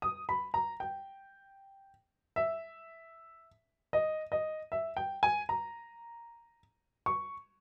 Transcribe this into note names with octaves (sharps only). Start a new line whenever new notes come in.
D#6
B5
A#5
G5
E5
D#5
D#5
E5
G5
G#5
A#5
C#6